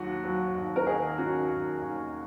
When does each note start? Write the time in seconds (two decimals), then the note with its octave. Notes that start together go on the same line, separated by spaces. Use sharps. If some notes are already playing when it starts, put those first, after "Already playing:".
Already playing: D#2 F#3 F#4
0.24 F#3
0.55 D#2
0.76 A#4
0.86 D#3 D#4 G#4
1.18 D#3 C#4 F#4
1.50 D#2
1.82 D#2